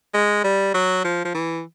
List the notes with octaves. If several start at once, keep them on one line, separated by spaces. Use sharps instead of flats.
G#3
G3
F#3
F3
F3
E3